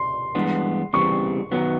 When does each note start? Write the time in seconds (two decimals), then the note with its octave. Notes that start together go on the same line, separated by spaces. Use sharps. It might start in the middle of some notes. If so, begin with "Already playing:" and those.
Already playing: C6
0.35 G2 E3 G#3 B3 D4
0.93 E2 C#3 E3 G3 C4 C#6
1.51 F#2 D#3 F#3 B3